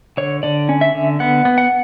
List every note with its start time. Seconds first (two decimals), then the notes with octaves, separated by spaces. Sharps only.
0.17 D3 C#5
0.43 D3 D5
0.69 C#4
0.81 E5
0.95 D3
1.20 B3 F#5
1.45 B3
1.58 F#5